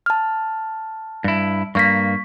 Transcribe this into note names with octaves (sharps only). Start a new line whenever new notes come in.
A5 F6
G2 E4
G2 A#3 C#6 B6